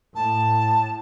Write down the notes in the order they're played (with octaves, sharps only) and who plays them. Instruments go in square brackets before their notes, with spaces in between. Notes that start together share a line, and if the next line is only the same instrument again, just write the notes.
[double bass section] A2 [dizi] A5